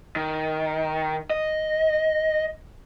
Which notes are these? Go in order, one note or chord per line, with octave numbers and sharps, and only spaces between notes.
D#3
D#5